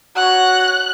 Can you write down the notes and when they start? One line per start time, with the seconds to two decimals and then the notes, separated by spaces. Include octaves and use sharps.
0.17 F#4 C#5 F#5 F#6